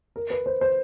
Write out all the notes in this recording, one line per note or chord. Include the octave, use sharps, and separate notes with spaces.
A#4
B4
C5
C5